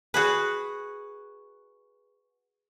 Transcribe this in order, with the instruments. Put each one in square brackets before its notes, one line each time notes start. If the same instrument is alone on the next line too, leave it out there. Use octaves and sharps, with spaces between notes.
[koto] F#4 G#4 B4